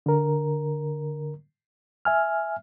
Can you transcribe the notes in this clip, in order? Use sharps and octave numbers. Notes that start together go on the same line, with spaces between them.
D3 A#4
E5 G#5 F6